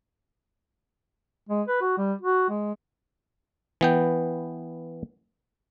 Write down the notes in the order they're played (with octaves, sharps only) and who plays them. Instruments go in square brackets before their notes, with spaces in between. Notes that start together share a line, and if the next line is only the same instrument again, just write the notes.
[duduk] G#3
B4
F#4
G3
F#4
G#3
[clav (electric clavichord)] E3 B3 G5